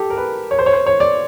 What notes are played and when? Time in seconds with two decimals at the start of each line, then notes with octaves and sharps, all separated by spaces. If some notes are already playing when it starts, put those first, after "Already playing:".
Already playing: G4 A4
0.10 A#4
0.17 B4
0.51 C#5
0.59 C5
0.66 C#5
0.73 C5
0.86 C#5
1.00 D5